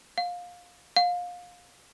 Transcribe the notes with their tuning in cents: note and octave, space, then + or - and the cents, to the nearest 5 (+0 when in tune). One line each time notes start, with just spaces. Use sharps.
F5 +20
F5 +25